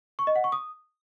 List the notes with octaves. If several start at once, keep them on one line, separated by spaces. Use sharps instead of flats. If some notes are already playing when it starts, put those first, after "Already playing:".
C#6
D#5
F#5
C#6
D#6